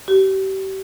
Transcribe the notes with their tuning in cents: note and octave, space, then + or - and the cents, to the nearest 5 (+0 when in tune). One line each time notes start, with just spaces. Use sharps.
G4 -35